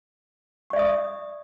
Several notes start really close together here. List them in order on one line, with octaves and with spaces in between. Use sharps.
C#6 D5 E5 D#6